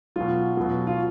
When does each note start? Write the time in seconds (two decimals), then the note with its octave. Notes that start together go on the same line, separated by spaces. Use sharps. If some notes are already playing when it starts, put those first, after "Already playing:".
0.16 B2 F#3 F4
0.57 B2 F#3
0.87 F4